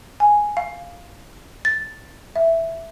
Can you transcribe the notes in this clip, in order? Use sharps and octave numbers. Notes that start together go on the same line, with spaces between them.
G#5
F5
A6
E5